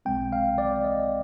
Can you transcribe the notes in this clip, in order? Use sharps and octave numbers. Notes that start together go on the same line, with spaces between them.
B1 B2 G#3 C4 G5
F5
D5
D#5